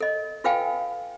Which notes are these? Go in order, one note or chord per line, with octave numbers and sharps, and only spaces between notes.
A4 D#5
F4 A4 B4 F5 G5 G#5